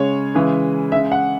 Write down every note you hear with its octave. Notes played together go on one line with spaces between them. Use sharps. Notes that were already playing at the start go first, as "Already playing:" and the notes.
Already playing: C#3 G#3 C#5
C#3 E3 G#3
C#3 G#3 E5
F#5